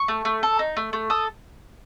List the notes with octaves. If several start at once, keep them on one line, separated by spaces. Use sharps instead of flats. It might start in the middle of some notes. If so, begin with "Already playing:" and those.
Already playing: C#6
A3
A3
A4
D#4
A3
A3
A4 D#6